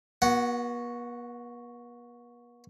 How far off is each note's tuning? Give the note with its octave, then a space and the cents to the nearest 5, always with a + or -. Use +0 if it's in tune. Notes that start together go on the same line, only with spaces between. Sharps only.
B3 -45 F#4 +0 F#5 +0